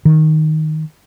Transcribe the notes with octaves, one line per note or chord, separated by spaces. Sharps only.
D#3